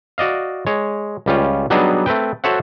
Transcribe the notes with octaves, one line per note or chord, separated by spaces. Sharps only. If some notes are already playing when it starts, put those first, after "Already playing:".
F#4 D5 D#5 F5
G#3 C#5
C#2 G3 C#4 F4
F#3 G3 B3 D4 D#4 G#4
A3 C4 B4 G5
F#4 A4 C5 C#5 E5 F#5